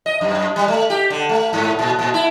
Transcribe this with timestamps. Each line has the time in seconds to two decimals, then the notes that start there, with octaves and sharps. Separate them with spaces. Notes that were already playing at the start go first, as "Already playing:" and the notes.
0.06 D#5
0.21 F#2
0.56 G3
0.68 A3
0.90 G4
1.10 D3
1.29 A3
1.53 G#2
1.79 A#2
1.99 A#2
2.14 E4